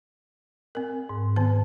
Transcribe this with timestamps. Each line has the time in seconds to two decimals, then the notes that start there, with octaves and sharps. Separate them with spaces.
0.75 C4 A#4
1.09 G#2
1.36 D#3 B3 A5